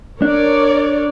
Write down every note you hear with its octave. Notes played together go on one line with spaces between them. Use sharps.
D4 A#4 C#5 D5